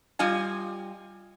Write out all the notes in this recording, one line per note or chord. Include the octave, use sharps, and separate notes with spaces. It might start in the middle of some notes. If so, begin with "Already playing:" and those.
G3 F4 D#5 G#5